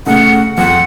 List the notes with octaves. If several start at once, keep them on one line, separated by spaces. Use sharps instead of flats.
C#3 A3 F#5
F2 F#5